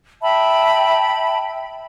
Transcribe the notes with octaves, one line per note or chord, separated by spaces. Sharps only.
E5 G5 A5 B5